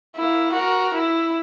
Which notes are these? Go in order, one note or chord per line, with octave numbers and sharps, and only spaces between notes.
A#3 E4
F#4 A#4
E4